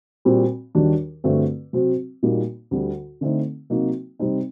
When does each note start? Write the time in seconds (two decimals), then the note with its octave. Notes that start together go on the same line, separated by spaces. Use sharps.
0.25 A#2 G3 C4 F#4
0.75 D#2 D#3 G3 D4 F#4
1.24 G2 D3 A3 C4 F#4
1.73 C3 F#3 C4 F#4
2.23 A#2 G3 A#3 D#4 F#4
2.71 D2 D3 G3
3.21 D3 A3 C4 D#4
3.70 C3 F#3 A#3 D#4 F#4
4.19 C3 G3 C4 D#4